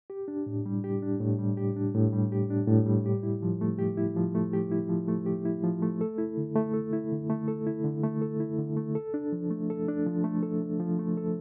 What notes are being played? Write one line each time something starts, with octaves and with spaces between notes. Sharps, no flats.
G4
D4
A2
G3
G4
D4
A2
G3
G4
D4
A2
G3
G4
D4
A2
G3
G4
E4
F3
A3
G4
E4
F3
A3
G4
E4
F3
A3
G4
E4
F3
A3
A4
E4
D3
A3
A4
E4
D3
A3
A4
E4
D3
A3
A4
E4
D3
A3
A4
D4
F3
A3
A4
D4
F3
A3
A4
D4
F3
A3
A4